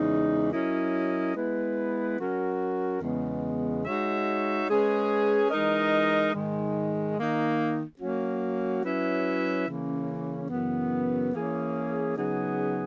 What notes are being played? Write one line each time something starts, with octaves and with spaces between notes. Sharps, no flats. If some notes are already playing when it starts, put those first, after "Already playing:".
Already playing: E2 C#3 G#3 D#4
F#3 C#4 E4 A#4 D#5
G#3 B3 E4 B4
F#3 C#4 F#4 A#4
E2 C#3 G#3 B3
G#3 D#4 F#4 C#5 E5
G#3 C#4 G#4 B4
E3 G#3 D#4 A#4 D#5
G#2 D#3 G#3
D#3 A#3 D#4
F#3 A#3 C#4 F#4
F#3 C#4 E4 B4 E5
C#3 E3 A#3 C#4
F#2 C#3 E3 B3
E3 A#3 C#4 G#4
C#3 F#3 B3 D#4 G#4